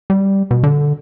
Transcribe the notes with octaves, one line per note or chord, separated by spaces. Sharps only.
G3
B2
D3